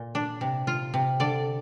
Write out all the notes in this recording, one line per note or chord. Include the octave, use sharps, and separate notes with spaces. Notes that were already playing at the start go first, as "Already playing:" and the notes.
Already playing: A#2
D4
C3
F4
C3
D3 D5